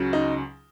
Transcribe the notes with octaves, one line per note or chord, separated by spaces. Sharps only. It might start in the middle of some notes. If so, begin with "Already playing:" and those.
Already playing: C#2 C#3 F#3
D#4